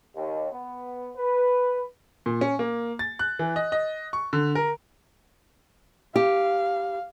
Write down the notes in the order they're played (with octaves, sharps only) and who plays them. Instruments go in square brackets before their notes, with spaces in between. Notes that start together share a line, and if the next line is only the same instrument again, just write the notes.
[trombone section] D#2
B3
B4
[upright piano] A#2
C#4
A#3
A6
F#6
E3
D#5
D#5
C#6
D3
A#4
[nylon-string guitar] G4 [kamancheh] F5